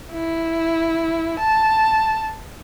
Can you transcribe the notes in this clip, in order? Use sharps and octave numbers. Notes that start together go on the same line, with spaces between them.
E4
A5